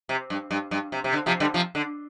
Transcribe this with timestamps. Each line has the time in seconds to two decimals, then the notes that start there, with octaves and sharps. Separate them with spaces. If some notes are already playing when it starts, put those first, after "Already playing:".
0.09 C3
0.30 G2
0.51 G2
0.71 G2
0.92 C3
1.04 C3
1.13 D3
1.26 C3 F3
1.40 D3 G3
1.54 C3 F3
1.75 D3